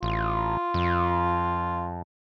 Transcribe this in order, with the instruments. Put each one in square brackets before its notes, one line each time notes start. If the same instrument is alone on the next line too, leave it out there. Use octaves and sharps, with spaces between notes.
[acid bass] A1 [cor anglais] F4
[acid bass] F2